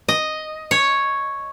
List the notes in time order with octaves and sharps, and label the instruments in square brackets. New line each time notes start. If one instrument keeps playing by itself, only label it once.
[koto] D#5
C#5